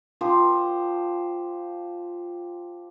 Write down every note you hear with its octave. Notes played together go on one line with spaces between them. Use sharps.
F3 G4 C5